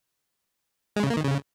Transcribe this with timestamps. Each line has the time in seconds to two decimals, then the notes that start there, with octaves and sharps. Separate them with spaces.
0.96 G#3
1.03 C#3
1.10 A#3
1.17 D#3
1.24 C#3